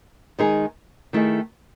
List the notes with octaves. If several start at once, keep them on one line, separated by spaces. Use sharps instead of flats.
D#3 G#3 D#4 G#4
D#3 A3 E4 G#4 D#5